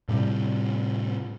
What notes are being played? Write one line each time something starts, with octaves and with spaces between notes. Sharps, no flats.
A2 C3 G3